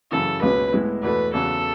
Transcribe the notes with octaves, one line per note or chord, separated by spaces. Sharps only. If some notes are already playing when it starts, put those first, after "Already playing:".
F#2 C#3 E3 A4
C#2 B2 G#3 C#4 B4
A2 G#3 B3 E4
E2 B2 A3 B4
E2 C#3 F#3 A4